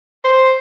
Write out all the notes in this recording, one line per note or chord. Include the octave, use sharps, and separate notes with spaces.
C5